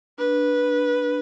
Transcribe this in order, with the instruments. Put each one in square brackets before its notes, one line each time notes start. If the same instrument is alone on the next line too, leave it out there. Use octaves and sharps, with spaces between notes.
[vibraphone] D4 [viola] B4